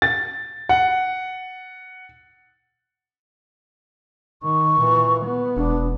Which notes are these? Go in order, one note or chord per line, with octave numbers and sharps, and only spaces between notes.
A6
F#5
D#3 C#6
A#2 E3
B3
E1 D4